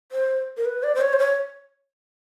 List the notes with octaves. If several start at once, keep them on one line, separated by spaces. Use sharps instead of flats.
C5
A#4
B4
D5
C5
C#5
C5
C#5